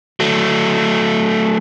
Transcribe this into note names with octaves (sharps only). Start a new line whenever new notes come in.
F#3 A3